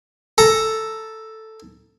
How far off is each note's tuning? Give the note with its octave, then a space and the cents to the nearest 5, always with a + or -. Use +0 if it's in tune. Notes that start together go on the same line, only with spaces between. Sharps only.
A4 +0 A#5 +0